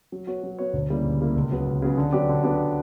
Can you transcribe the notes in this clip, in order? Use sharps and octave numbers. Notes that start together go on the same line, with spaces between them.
F#3
B3 F#4 C#5
F#3
B3 F#4 C#5
D2
C#3 G3 A#3 E4
D2
C#3 G3 A#3 E4
C#2
C#3 F#3 B3
C#2
C#3 F#3 B3
D3
F#3 B3 D4 G4
D3
F#3 B3 D4 G4